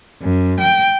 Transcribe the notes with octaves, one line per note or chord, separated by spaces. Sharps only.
F#2
G5